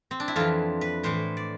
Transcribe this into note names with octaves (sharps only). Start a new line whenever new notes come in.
C4
D4
E4
F2 E3 F4
B4
A2 E3 C5
D5